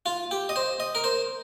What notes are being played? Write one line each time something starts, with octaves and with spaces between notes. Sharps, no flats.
F4
G4
D#5
C5
D#5
A#4
C5